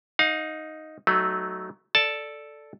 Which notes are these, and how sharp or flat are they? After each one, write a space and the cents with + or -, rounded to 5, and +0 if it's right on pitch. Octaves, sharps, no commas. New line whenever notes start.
D#4 +5 F5 +35
F#3 +15 A3 +0 D#4 -5
A4 +0 D5 +0 A5 +0